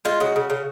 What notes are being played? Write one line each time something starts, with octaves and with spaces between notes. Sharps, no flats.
G#3 F4
C#3 F#4
C#3
C#3